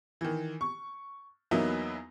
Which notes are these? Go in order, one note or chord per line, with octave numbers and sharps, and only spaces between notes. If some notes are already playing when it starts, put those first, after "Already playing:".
D#3 E3
C#6
E2 F#3 A#3 B3 D#4 E4